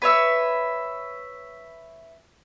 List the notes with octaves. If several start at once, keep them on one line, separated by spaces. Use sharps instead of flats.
B4 C#5 E5